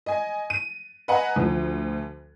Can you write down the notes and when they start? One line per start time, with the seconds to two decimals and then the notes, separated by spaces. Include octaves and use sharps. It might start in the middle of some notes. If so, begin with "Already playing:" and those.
0.06 D#5 G#5
0.50 D#7
1.08 B4 D#5 F#5 G#5 A#5
1.36 D2 F3